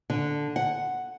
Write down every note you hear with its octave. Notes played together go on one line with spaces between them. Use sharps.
D3
F#5